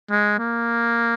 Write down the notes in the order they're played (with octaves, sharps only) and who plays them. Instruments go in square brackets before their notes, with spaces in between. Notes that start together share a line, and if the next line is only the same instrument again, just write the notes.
[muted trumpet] G#3
A#3